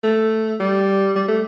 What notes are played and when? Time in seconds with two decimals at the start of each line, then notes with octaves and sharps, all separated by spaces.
0.04 A3
0.60 G3
1.16 G3
1.28 A3